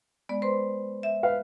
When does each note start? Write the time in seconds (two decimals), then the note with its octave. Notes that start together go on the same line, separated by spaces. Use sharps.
0.29 G#3 B3 D5
0.42 B4 C5 C6
1.03 E5
1.23 B4 F5